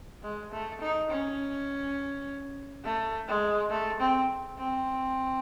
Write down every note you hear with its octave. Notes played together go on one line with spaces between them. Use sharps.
G#3
A3
D#4
C#4
A3
G#3
A3
C4
C4